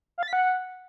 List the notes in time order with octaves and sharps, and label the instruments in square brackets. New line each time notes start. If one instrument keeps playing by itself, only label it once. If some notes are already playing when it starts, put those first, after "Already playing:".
[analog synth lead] F5
A6
B6
F#5